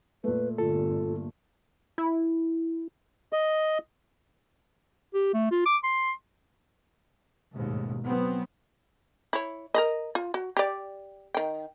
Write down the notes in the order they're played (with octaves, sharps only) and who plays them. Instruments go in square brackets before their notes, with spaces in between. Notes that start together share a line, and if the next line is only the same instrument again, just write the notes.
[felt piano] A#2 A3 [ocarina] B4
[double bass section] G1 [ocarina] F4 [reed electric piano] A4
[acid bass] E4
[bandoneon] D#5
[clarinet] G4
A3
F4
D6
C6
[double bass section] A1 D#2 G#2 B2
F#3 B3 C4
[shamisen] E4 C#5
A#4 B4 D#5
F4
F#4
G4 D5
D#3 G5